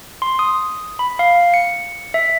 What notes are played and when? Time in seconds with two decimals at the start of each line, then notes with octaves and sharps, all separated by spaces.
0.22 C6
0.39 D#6
0.99 B5
1.19 F5
1.54 C#7
2.14 E5